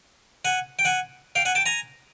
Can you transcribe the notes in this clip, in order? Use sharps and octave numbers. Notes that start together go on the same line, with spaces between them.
F#5 G#5
G5
F#5 G#5
F5 G5
F#5 G#5
G5 A5
G#5 A#5